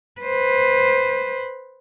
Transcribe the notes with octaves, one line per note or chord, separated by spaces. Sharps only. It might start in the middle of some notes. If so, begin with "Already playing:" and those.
B4 C5